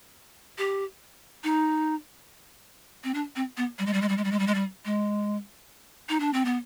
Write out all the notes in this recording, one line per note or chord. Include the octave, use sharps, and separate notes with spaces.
G4
D#4
C4
D4
C4
B3
G3
G#3
G3
G#3
G3
G#3
G3
G#3
G3
G#3
G3
G#3
D#4
D4
C4
B3